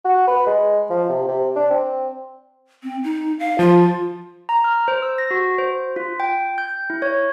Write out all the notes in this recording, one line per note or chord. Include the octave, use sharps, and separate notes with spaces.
F#4
B4
G#3
F3
C3
C3
D4
C4
C4
D#4
F5
F3 F4
A#5
F6
C5
E6
A#6
F#4
C5
F4
G5
G6
E4
C#5